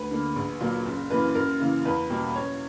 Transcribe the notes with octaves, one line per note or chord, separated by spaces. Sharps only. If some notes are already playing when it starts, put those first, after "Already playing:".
Already playing: D2 B4
D3 A#3
A#1
A#2 F#3 A#3
F#1
F#2 E3 A#3 B4
F#2 A#4
C#3 E3 A#3
E2 B4
B2 G3 A#3
F#2 C#5